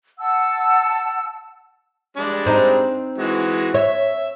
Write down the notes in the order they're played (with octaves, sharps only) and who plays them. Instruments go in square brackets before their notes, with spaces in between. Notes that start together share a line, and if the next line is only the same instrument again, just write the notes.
[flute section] F#5 A5 E6
[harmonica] G3 G#3 D4
[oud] C4 D#4
[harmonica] E3 G#3 F#4
[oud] C#5 [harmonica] E5